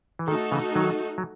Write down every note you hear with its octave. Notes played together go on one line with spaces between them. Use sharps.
E3
D#3 A3 D#4 F#4 A4
C#3 E3
D#3 F#3
F#3